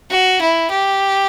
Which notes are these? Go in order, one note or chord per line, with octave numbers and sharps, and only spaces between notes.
F#4
E4
G4